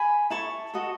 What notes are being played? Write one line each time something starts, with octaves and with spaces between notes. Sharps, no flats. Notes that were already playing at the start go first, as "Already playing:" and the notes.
Already playing: G#5 B5
E4 A4 C#5 A5 C#6
F#4 A4 D#5